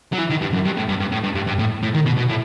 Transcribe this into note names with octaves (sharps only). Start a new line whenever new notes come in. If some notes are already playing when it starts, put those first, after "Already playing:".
F#3
E3
D#3
G2
F#2
G2
A2
G2
G2
A2
G2
G2
G2
A2
A2
D#3
B2
B2
A2